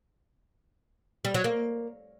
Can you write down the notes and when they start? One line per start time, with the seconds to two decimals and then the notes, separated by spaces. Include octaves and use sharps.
1.25 G3
1.34 F#3
1.44 A#3